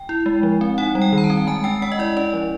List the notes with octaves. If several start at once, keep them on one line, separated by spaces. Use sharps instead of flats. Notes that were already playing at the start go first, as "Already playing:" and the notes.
Already playing: G5
E4
G#3
F3
C4
D#4 F#5
G3
G5
D#3
A#5
A5
C4
G#3 G#5
C#4 G5
G#3 F#5
D#5
E4 D5
C#4 D5
F3